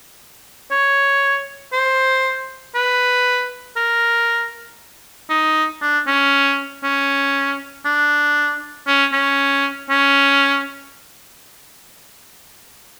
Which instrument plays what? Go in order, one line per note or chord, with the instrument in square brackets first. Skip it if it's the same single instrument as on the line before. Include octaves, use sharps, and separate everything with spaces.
[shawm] C#5
C5
B4
A#4
D#4
D4
C#4
C#4
D4
C#4
C#4
C#4